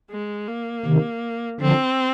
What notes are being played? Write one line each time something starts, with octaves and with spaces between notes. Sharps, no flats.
G#3
A#3
C3 D#3
D3 F3 C4